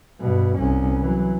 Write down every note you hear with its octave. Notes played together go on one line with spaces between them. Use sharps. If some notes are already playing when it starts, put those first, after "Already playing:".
G2 B2
C2 C#4
E3 F#3